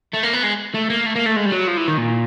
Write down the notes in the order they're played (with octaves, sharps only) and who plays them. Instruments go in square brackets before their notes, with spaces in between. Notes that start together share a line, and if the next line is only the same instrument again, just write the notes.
[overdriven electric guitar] A3
A#3
B3
G#3
A3
A#3
A3
A#3
A3
G#3
G3
F#3
F3
E3
D#3
A#2